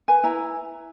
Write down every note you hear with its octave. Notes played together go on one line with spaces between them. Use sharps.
B4 G#5
E4 A#5